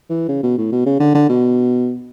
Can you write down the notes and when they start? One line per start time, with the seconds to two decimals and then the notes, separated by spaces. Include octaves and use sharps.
0.09 E3
0.29 C#3
0.43 B2
0.58 A2
0.72 B2
0.86 C#3
1.00 D3
1.15 D3
1.29 B2